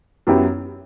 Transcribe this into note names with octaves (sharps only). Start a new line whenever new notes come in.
F#2 F#3 B3 E4 G4